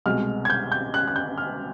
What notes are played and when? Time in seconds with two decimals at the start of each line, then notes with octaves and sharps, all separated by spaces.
0.06 C2 B2 G#3 F6
0.45 G#6
0.50 G6
0.72 G6
0.94 F#6
1.08 F#6
1.16 G6
1.38 F6